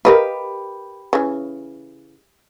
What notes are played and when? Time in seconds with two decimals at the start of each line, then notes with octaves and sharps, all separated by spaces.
0.05 G4 A#4 B4 D#5 F5
1.13 C#3 E3